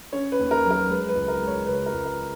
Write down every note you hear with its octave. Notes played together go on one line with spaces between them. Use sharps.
C#4 C#5
B4
D#2
A#4
F#3
A#4
G#3 B4
B4
C#2
A#4
G#3
C#5
C#3 B4
A#4
C#2
A#4